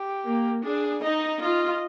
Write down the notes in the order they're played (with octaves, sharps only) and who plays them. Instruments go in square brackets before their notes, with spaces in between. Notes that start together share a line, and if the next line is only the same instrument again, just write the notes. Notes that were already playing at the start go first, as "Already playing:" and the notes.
Already playing: [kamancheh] G4
[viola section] A#3
[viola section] D4 [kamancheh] G#4
[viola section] D#4 [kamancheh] D#5
[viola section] F4 [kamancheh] D#5